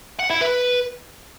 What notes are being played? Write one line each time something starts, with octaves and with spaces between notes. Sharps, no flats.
F#5
E4
B4